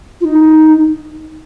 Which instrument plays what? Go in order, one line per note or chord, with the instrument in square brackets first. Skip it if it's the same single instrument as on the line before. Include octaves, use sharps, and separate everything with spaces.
[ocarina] F4
D#4